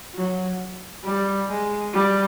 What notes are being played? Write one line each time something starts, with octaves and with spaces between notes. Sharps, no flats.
F#3
G3
G#3
G3